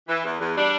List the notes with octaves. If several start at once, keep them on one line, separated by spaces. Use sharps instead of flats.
E3
E2
E2
G3 D4